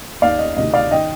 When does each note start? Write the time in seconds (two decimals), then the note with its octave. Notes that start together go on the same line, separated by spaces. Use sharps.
0.22 D#2 D#3 D5 F5
0.39 D#5
0.56 D2 C3 D#3 D#5
0.74 D5 F5
0.91 D#3 D#5 G5